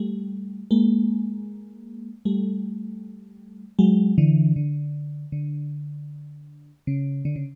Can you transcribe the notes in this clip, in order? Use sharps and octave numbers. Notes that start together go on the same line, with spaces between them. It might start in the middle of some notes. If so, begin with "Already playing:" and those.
Already playing: G3 A3
G#3 A#3
G3 A3
F#3 G#3
D3 E3
D3
D3
C#3
D3
C#3